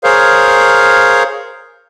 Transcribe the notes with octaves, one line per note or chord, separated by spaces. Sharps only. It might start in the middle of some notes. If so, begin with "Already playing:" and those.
G#4 A#4 C5 C#5 F5